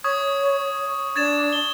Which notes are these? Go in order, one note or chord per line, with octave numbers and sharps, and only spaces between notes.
C#5 C#6 D#6 G#6
D4 G#6 A6 E7
G7